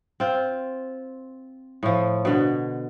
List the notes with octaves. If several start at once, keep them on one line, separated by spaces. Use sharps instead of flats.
C4 F4
A2 F3
B2 D3